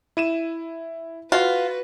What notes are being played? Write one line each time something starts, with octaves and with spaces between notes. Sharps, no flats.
E4 D#7 E7
F4 F#4 B4